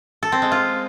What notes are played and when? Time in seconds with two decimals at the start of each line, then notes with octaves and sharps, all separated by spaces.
0.23 A4
0.32 C4
0.42 G#3
0.52 F4